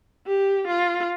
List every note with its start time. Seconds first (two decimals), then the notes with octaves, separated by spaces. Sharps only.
0.27 G4
0.67 F4